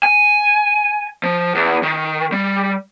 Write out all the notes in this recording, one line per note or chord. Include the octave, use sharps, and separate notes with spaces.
G#5
F3
E2
D#3
G3